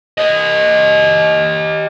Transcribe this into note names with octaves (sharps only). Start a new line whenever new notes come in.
G4 D#5